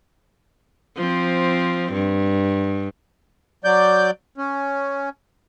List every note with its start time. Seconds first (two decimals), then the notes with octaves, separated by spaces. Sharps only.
0.97 F3 C4
1.93 G2
3.64 F#3 D5 G6
4.38 C#4